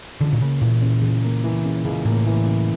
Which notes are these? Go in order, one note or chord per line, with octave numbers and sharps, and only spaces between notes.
C#2 D3
A#2
C#3 A#3
A#2 E3
C#3
C#2
A#3
E3
C#3
C#2
A2 A#3
E3
C#3